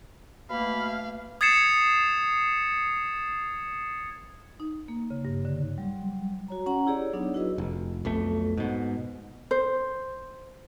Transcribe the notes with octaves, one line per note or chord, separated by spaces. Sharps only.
B2 A3 A#3 F5 B5
D#6 G#6 A6 C7 C#7 E7
D#4
A#3
C#3
G2
D3
F#3 G3
F#4 C#5 A#5
C#4 F#5 A#5
E4 G4 G#4 C#5 D5
F#3 B3 D4 D#4
E4 F#4 G#4 B4 D#5
F1
B1 F2 A3
G#2 B2
C5